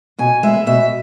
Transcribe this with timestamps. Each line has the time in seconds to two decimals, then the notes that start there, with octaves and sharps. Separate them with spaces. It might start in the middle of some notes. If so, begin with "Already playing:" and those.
0.18 B2 G#5
0.43 G#3 B3 E5
0.66 B2 E5